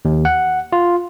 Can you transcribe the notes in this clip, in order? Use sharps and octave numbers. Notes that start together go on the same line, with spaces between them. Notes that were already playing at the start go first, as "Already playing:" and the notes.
D#2
F#5
F4